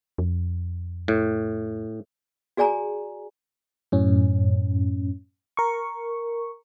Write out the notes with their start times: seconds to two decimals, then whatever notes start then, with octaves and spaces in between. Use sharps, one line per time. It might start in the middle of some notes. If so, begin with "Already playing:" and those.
0.18 F2
1.08 A2
2.57 F#4 G#4 D5 G#5 A#5
3.92 F#2 A2 C#4
5.57 A#4 C#6